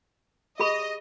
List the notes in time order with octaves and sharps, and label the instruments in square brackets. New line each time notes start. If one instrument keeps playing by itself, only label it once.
[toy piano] G4 G#4 B5 [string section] D#5